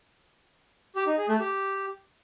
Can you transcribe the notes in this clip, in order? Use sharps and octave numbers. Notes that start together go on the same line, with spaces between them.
G4
D#4
G#4
A3
G4